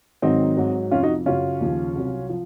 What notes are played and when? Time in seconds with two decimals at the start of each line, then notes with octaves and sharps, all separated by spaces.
0.22 G#2 D#3 F#3 C4 D#4
0.57 G#2 F#3
0.91 F2 C3 F3 C#4 F4
1.03 D#4 F#4
1.26 F#2 C#3 F#3 C#4 F4
1.61 D#2 C#3 F3
1.96 C2 C3 F#3
2.29 F3